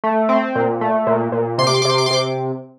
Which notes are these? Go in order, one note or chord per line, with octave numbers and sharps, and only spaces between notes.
A3
C4
A#2
A3
A#2
A#2
C3 C6
D6
C6
D6
C3 C6
D6
C6
C3 D6